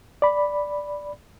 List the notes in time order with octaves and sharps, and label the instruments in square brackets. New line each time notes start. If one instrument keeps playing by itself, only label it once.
[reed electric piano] D5 B5